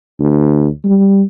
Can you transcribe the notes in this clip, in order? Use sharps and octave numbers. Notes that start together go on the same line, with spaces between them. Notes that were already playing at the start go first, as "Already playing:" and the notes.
D2
G3